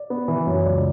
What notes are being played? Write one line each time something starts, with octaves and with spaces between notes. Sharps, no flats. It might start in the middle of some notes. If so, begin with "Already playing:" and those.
Already playing: D5
B3
E3
F#2
C#2 D5